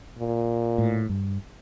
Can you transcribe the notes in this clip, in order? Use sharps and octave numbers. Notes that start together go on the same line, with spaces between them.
A#2
A2
G2